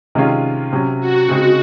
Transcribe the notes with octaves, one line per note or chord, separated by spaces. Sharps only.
C3 D#3 G#3 C#4 F4
C3 F#3 C#4
F#4
C#3 G#3 C4 D#4 F#4